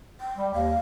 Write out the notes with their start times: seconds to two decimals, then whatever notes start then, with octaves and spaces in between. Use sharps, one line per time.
0.20 G5
0.37 G3
0.54 D#2 F5